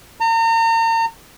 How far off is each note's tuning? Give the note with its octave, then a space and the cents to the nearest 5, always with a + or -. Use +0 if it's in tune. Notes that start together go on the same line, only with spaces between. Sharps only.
A#5 -40